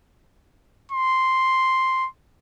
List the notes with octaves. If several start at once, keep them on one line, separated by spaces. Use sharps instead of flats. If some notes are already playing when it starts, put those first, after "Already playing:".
C6